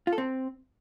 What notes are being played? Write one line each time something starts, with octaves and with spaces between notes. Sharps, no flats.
F4
A4
C4